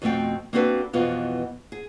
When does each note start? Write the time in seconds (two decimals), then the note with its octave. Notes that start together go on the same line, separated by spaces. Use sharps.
0.02 F2 B2 A3 C4 G5
0.53 A#3 C4 D4 F#4 A4 B4
0.93 F2 B2 E3 B3 F4
1.72 G#4